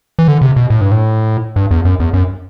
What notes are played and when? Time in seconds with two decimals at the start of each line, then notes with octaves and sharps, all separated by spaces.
0.19 E3
0.28 D3
0.41 C3
0.56 B2
0.70 A2
0.81 G2
0.92 A2
1.56 G2
1.71 E2
1.85 F#2
2.00 E2
2.14 F#2